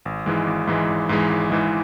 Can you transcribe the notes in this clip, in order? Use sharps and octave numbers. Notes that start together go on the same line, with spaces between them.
G#1
G#2 E3 G#3
G#1
G#2 E3 G#3
G#1
G#2 E3 G#3
G#1
G#2 E3 G#3